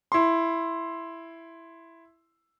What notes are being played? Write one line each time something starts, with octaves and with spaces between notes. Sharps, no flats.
E4 C6